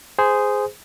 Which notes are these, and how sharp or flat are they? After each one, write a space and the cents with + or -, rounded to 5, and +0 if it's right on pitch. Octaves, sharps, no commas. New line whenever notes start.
G#4 +0 C5 -15